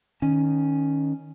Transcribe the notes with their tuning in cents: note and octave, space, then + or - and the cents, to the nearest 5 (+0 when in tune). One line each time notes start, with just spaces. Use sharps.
D#3 -10 C#4 +0